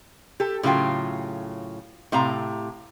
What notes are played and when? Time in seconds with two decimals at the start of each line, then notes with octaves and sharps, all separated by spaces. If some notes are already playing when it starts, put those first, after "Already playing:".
0.40 G4 A4
0.63 A2 C#3 F#3 F4 G5
2.12 A2 C3 F5 A#5